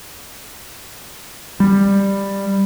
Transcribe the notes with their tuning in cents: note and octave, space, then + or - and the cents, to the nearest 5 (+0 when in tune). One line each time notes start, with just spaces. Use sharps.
G3 +10